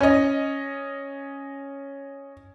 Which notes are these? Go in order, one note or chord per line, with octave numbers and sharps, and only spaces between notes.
C#4 D#5